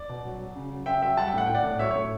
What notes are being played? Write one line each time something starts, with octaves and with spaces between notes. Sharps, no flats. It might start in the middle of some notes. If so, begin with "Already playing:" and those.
Already playing: D5
B2
F#3
F#3
C#3
F#3
C#3 E5 G5
F#3 E5 G5
G3 F#5 A5
E5 G5
A2 F#5
A2 G5
D5 F#5
A2
F#3 C#5 E5
C#5
A2